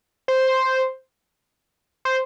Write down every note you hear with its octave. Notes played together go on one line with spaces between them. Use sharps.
C5
C5